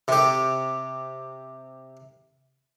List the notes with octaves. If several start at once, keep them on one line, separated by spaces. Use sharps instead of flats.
C3 G4